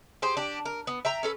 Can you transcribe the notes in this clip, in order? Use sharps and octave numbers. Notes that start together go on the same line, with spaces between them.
G4 G#4 C5
D4 G4
A#4
B3
E5 G5 A#5
C#4 A4 B4